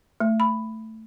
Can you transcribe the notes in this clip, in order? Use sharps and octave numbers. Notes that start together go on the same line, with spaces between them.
A3
B5